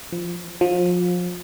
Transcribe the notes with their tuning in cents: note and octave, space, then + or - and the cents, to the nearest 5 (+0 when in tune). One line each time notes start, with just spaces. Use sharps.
F3 -10
F3 +30